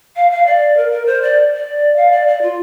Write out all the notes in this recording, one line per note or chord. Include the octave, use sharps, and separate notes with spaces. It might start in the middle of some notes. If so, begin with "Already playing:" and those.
F5
F5
D5
A#4
A#4
C5
D5
D5
F5
D5
D5
F4